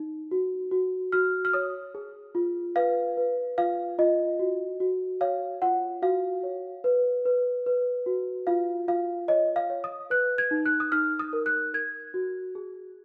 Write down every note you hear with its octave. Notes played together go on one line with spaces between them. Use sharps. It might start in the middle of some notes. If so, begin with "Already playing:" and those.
Already playing: D#4
F#4
F#4
F#4 F6
F6
C#5 D#6
G#4
F4
B4 F5
B4
F4 F5
F4 D#5
F#4
F#4
C#5 F5
F4 F#5
F#4 F5
C#5
B4
B4
B4
F#4
F4 F5
F4 F5
C#5 D#5
F5
C#5
D#6
B4 F#6
G#6
D#4
F#6
D#6
D#4 F6
D#6
A#4
F#6
A#4 G#6
F#4
G#4